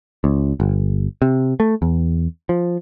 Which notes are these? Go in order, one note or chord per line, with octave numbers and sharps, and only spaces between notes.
C#2
G1
C3
A3
E2
F3